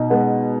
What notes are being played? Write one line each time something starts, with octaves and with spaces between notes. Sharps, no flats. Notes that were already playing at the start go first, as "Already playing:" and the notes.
Already playing: B2 D#4
G#3 B3